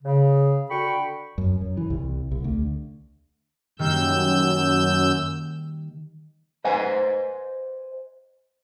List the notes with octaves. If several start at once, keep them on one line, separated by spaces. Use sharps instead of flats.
C#3
D3 F#4 G5 B5 C#6
F#2
F#2
E3
C2
C2
D2
F#2 D#3 G3 A#3 E6 G6
B4 C5 D#5 F#5 G#5